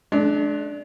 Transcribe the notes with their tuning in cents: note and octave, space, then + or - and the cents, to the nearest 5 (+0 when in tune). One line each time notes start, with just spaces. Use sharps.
G#3 +45 D4 +0